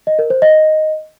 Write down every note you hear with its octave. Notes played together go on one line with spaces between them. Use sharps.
D#5
A#4
C5
D#5